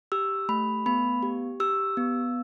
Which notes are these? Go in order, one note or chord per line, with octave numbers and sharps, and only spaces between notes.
G4 E6
A3 B5
B3 B5
G4
G4 E6
B3